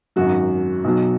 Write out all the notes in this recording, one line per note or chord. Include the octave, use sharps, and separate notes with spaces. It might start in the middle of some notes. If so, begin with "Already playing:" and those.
G#1 F#2 F#3 F#4
B1 B2 F#3